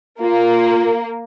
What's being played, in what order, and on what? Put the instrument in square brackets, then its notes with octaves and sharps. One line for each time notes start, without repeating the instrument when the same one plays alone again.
[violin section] A#3 [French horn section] F4